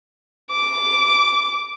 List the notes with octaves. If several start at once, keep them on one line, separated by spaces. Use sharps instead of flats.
D6